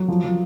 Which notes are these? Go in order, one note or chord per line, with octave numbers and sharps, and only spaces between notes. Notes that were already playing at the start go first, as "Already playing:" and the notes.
Already playing: F#3
F3
F3